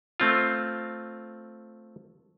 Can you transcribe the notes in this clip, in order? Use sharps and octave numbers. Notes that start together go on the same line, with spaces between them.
A3 C4 F4